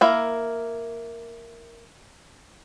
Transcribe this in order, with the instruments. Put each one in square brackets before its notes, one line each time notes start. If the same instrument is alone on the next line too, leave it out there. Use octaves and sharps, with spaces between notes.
[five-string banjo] A#3 E4 A#4